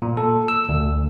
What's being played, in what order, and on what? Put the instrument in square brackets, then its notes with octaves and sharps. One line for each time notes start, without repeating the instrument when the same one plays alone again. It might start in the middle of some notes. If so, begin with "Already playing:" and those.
[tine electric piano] A#2
A4
E6
D2